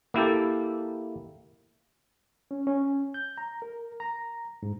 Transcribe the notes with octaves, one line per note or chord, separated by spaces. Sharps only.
A#3 E4 G4 A4
C#4
C#4
G6
A#5
A#4
A#5
G#2